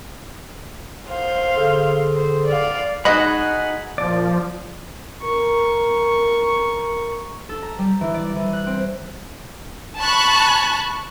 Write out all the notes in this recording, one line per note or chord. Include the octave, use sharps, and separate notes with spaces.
C5 F5
D3 G#4 A4
C5
D5 F5
G#3 D#4 F#4 D#5 F#5 G#5 B5
A#2 F3 D5
A#4 C#6
A4
A#5
G3
E3
D5
E3
F#6
C4
A5 B5 C#6 F#6